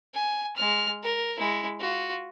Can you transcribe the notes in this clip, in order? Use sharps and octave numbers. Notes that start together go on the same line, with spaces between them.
G#5
G#3 F6
A#4
G#3 E4
F4 F#4